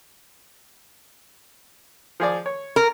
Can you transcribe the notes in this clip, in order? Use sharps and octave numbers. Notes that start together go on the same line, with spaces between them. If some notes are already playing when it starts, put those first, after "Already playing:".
F3 G#4 D5
C#5
A#4